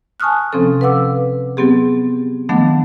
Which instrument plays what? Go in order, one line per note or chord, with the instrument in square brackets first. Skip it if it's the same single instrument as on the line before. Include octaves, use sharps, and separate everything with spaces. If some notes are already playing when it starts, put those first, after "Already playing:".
[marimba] G#5 A5 C#6 D#6 F6 F#6
C3 F3 C4 C#4 A4
B4 F5 F#5 D6 E6
F#3 B3 C4 G4 G#4
D#3 F3 F#3 A3 B3 D4